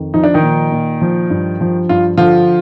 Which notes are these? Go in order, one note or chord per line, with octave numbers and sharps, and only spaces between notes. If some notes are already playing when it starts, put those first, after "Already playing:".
Already playing: F2 D#3
F3 D#4
D4
D#3 D#4
A#2
A#2
F3
G2
F3
G2 F4
D3 F3 F4